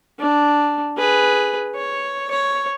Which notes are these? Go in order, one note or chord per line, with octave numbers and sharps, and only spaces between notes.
D4
G#4 B4
C#5
C#5